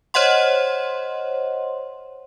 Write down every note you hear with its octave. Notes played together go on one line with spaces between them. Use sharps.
C5 C#5 D#5 F#5 C6